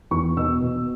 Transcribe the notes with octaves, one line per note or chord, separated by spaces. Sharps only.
E2 C#6
B2 E6
B2